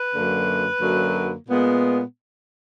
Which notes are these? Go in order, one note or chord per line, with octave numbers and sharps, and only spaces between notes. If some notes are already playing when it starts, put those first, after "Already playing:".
Already playing: B4
F#2 D3 F#3 A#3
F#2 D3 F#3 A#3
A#2 G#3 B3